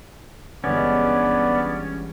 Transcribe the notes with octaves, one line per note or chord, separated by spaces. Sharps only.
G1 E3 G#3 B3 C#4 D5